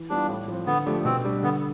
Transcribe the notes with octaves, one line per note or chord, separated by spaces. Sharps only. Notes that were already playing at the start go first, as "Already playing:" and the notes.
Already playing: E3
G3 B3 D4 F4
A2
F3 C4
D3 B3
F3 A3 D4 G4
B2 C4
G3 D4
D3 B3